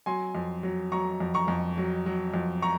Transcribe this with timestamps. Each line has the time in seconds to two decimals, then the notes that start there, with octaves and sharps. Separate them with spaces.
0.06 F#3 G#5 C6
0.35 F2
0.63 F#3
0.92 F#3 A#5 C#6
1.20 F2
1.34 A#5 C#6
1.48 F2
1.78 F#3
2.06 F#3
2.34 F2
2.62 A#5 C#6